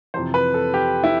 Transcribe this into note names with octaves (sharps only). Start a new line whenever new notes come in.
F2 C3 E3 C5
B4
A4
G4
E4